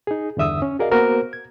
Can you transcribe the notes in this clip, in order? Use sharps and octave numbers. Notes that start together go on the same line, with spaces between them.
D#4 G#4
E2 G2 D3 E5 D#6 E6
C#4
F#4 G#4 A#4 D5 D#5 F5
A#3 B3 F#4 A#4 C5
G#6